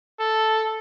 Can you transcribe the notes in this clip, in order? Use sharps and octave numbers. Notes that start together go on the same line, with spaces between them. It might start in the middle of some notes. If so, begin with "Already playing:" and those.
A4